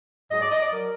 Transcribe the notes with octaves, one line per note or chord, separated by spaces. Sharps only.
G#2 F#3 D#5
D5
D#5
D5
F#3 A#4